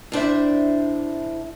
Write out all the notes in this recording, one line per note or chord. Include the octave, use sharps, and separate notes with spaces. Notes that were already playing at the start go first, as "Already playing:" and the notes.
A2 D4 C5 E5